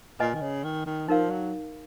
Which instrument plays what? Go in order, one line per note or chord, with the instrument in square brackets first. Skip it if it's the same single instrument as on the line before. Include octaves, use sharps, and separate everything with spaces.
[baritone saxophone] A#2 [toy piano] B4 D#5 G#5
[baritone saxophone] D#3
C#3
D#3
D#3
[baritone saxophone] F3 [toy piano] D#4 A#4 F5
[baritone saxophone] F#3